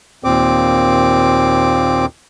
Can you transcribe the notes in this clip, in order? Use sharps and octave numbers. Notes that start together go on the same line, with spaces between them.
D#2 A#2 C4 D6